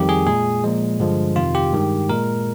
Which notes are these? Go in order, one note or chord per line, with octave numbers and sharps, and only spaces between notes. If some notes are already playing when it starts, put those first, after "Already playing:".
Already playing: F2 D#3 G3 G4
G#4
A#2 G#3 G#4
A#2 F3 G#3
G2 D3 F3 G#3
F2 C3 D#3 F4
G4
G2 D#3 G#3
A#2 G#3 A#4